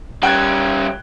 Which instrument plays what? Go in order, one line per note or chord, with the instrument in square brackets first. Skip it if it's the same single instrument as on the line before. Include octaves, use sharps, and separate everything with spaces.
[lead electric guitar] G3 C#4 [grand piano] G5 F#6 G#6